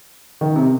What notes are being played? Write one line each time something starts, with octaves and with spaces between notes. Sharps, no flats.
D#3
C3